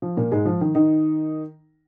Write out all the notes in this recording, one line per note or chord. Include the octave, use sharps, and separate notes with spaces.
F3
A#2 A#3
G#2 G#3
F3
D#3
D#3 D#4